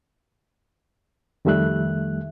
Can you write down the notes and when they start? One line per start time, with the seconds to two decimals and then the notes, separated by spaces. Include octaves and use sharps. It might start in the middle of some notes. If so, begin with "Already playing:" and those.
1.45 F2 D#3 G3 A3 E5 F#6